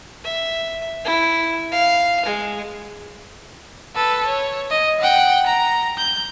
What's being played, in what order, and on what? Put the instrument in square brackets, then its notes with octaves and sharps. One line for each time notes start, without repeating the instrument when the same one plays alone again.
[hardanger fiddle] E5
E4
F5
G#3
[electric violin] A4 B4
C#5
D#5
F#5 G5
A#5
G6